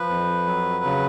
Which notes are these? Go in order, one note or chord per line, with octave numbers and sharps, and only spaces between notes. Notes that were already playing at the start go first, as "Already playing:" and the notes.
Already playing: F3 B4
F2
F#3
C#3